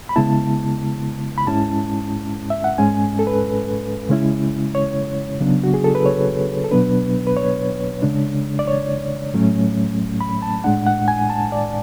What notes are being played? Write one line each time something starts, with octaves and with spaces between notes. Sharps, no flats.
B5
C#3 G#3 B3 E4 A5
B5
G#2 G#3 C#4 E4 A5
E5
F#5
G#2 G#3 C#4 G#5
A4
B4
C#3 G#3 C#4 E4
C#5
C#3 F#3 B3 D4
F#4
G#4
A4
B4
C#5
A4
B2 F#3 B3 D4 B4
B4
C#5
C#3 G#3 D4
D5
C#5
A2 F#3 A3 C#4
B5
A5
A2 G#3 D4 F#5
F#5
G#5
A5
D5